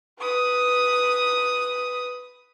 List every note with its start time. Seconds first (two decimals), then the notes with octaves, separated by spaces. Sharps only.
0.19 B4 D#6